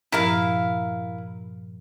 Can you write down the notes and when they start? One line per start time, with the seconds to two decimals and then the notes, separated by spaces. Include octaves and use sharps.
0.12 G2 A#2 F3 E4 A#4 F5